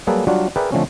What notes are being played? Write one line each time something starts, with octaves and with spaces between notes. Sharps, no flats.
F#3 G3 A#3 G#4 A4 B4
F#3 G3 D4 F4 F#4
G#4 A#4 B4 D5 E5 G5
D3 F3 A3 C4 C#4